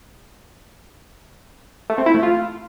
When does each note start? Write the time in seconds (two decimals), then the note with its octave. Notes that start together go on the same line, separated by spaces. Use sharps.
1.90 A3
1.98 C4
2.06 E4
2.15 A3
2.23 F4